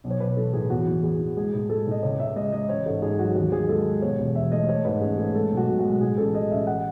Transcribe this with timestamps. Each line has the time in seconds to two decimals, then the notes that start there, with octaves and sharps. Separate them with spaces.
0.04 B1
0.10 C#5
0.20 B1 B4
0.37 E3 A4
0.53 A2 G#4
0.70 E2 F#4
0.87 E3
1.03 E2 G#4
1.20 E3
1.37 G#3 G#4
1.53 A2
1.69 G#3 A4
1.86 A2 D#5
2.03 C#2 C#5
2.19 C#2 E5
2.36 G#3 D#5
2.52 G#3 D#5
2.69 A1 C#5
2.86 G#2 A4
3.02 G#2 G#4
3.19 F#3 F#4
3.36 D#2 F#4
3.52 D#2 G#4
3.69 G#3 A4
3.85 G#3
4.02 B2 C#5
4.19 E1
4.35 E2 E5
4.51 A3 D#5
4.68 A3 C#5
4.85 G#2 B4
5.01 A1 G#4
5.18 A3 G#4
5.35 G#3 A4
5.51 B1
5.57 F#4
5.68 B1
5.79 F#4
5.85 G#3
6.01 A2 G#4
6.18 A1 A4
6.34 A1 D#5
6.50 A1 E5
6.67 F#5